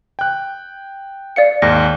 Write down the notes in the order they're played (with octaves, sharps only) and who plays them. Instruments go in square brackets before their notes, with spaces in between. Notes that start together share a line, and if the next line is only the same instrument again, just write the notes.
[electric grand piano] G5 F#6
[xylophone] D5 F5 C#7
[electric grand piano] D#2 G#2 [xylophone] A#6